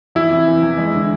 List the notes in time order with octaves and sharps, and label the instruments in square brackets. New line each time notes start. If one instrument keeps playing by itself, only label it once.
[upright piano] E2 [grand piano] E4
[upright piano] C3
E3
E2
G#3
D3